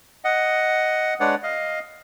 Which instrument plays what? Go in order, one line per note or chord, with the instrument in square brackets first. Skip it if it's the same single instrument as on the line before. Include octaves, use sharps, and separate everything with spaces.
[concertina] D#5 F#5
G#3 D4 B4 C#5 D5 F#5
D#5 F5